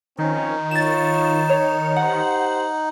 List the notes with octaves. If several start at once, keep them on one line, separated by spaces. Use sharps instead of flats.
D#3 F3 C4 C#4 D#4
F4 C#5 A6 E7
C#5
G4 C5 F#5